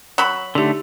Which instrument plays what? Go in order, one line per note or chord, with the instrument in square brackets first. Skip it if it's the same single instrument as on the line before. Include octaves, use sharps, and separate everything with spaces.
[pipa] F#3 B5
[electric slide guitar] D3 A3 [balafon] D#4 G4